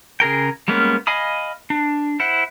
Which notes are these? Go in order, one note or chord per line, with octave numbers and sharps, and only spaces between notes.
C#3 G#4 A#4 G5
G3 G#3 A#3 B3 C#4
D#5 F5 G#5 B5 D#6
D4
E4 C5 F#5